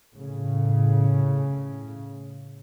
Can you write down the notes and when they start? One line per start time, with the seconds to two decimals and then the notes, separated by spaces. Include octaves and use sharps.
0.16 A2 C#3